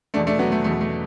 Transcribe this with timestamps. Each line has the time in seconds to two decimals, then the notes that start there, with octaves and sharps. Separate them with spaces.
0.14 E2 B2 A3 D4
0.27 A3 D4
0.39 F#3 B3
0.52 A3
0.64 E2 B2 A3
0.81 A3